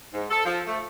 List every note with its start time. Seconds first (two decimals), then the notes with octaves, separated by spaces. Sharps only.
0.13 G#2
0.30 A4
0.46 F3
0.68 A3